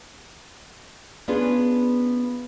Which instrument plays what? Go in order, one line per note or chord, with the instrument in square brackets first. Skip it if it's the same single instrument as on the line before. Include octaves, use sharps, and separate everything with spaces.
[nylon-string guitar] B3 C#4 D4 F4 G#4 B4